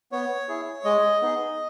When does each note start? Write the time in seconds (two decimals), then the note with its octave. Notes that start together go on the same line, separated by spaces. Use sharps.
0.12 B3 C#5
0.48 E4 G#4
0.84 G#3 D#5
1.22 B3 D#4 G#4